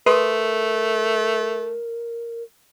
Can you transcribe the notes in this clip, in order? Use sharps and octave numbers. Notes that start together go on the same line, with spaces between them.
A3 A#4 B4 C6 D#6